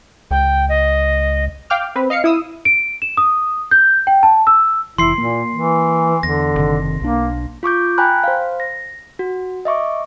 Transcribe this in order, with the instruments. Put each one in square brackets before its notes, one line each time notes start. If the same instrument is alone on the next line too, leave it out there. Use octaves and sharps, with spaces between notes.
[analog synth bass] C#2 [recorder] G5
[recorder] D#5
[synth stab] F5 G5 D6 F6
C4 B4
D#5 F5 C7 C#7
E4 D#6 E6
[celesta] D7
E7
D#6
G6
G5
A5
E6
[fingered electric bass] F1 E3 [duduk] E4 [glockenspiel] C6 C7
[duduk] A#2 [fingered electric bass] A#3
[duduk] E3
[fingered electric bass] E2 [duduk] D3 [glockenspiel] A#6
[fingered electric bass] F#1 C3 D#3
[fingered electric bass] B1 D4 [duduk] A#3
[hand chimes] F4 C#6 D6 G6
G5 G#5 A#5 B5 F#6
C5 F5
A#6
F#4
D#5 E5 C#6 D6